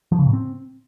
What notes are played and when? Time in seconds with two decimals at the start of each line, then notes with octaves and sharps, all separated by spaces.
0.12 F3
0.19 C#3
0.26 A2
0.33 C4